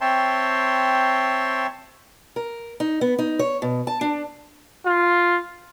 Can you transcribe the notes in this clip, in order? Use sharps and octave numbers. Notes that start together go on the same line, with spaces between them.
C4 C#5 E5 G5 A5 C6
A#4
D#4
B3
D#4
C#5
B2
A5
D4
F4